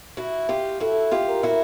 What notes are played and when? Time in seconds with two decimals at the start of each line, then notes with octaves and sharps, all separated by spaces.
0.17 E4 F#4
0.49 F4 G4
0.80 E4 F#4 A4
1.11 F4 G4
1.28 A#4
1.43 E4 F#4